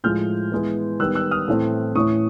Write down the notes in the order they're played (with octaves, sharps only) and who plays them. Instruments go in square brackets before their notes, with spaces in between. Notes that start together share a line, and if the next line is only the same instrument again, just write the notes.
[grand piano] A2 F3 G#3 F6 G6
E3 G#3 B3
D#3 G3 B3 E6 F#6
E6 F#6
D#6 F6
A2 E3 A3 C4
A2 E3 A3 C#4 C#6 D#6